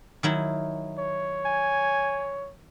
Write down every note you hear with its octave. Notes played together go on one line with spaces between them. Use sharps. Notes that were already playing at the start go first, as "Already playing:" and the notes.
D#3 F#3 E4
C#5
G#5